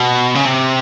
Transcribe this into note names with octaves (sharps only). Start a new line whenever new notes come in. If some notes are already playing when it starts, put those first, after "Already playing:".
Already playing: B2
C#3
C3